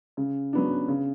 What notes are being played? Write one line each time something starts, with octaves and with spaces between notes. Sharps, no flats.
C#3
F#3 B3 D4
C#3